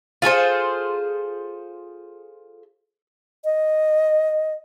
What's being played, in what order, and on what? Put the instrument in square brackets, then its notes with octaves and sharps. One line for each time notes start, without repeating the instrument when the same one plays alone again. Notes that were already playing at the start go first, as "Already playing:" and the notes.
[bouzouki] F4 G#4 A4 C5
[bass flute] D#5